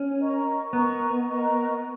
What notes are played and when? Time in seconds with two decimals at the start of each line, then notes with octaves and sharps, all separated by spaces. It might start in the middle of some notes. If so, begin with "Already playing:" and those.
Already playing: C#4
0.18 A#4 D#5 A#5 C#6
0.73 B3 A#4 D#5 A#5 C#6
1.29 A#4 D#5 A#5 C#6